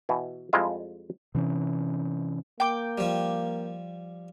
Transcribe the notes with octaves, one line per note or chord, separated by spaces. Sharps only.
B2 E3
F2 G3 G#3 E4 F4 F5
C3 E3 C#4
A#3 G5 D6
F3 G3